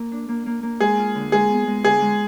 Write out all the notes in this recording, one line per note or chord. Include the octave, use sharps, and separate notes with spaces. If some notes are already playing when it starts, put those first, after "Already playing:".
Already playing: A#3
D4
A#3
A#3
A#3
G#3 G#4
F4
D3
G#3 G#4
B3
G#3
D3 G#4
G#3